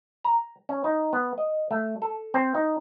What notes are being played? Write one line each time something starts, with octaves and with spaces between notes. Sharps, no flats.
A#5
C#4
D#4
B3
D#5
A3
A4
C4
D#4